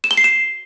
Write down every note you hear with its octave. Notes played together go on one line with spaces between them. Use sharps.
E7
G7
C7
E7